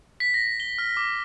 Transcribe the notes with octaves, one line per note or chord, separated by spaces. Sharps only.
B6
A#6
G7
F6
D6